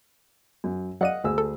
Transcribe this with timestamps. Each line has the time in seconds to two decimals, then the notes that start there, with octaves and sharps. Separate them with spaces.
0.64 F#2
1.01 F#3 D5 D#5 F5 F#5 D#7
1.24 D2 G#4 E6
1.38 A4